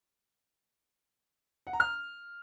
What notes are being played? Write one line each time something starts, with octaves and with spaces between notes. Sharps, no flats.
F#5
A#5
F6